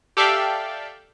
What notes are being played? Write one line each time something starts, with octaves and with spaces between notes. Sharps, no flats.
G4 A4 D5 E5 F5 G5